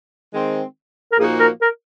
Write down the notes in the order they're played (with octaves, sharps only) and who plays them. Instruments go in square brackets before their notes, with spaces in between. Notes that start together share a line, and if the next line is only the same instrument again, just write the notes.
[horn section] D#3 G#3 C4
[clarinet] A#4
[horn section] A#2 F3 A#3 D#4 F#4 [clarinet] G#4
[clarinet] A#4
A#4